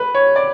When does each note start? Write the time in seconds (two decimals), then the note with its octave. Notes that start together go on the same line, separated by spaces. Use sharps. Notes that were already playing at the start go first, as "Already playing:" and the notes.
Already playing: B4
0.15 C#5
0.36 D5